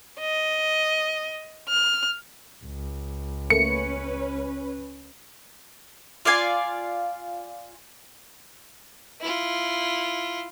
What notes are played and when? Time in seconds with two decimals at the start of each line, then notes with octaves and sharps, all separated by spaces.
0.20 D#5
1.69 F6
2.65 C#2
3.50 A3 A#3 C#4 B4 C#7
6.25 F4 D5 F5 G#5
9.21 E4 F4